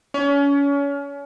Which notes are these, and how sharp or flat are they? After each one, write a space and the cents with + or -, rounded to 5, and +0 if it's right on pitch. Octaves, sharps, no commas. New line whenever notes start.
C#4 +30